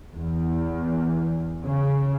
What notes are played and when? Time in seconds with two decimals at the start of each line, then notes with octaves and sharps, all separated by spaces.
0.15 E2
1.65 C#3